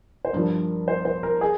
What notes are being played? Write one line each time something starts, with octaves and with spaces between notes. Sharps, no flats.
C5
G2 F3 A#4
C5
C5
A#4
G#4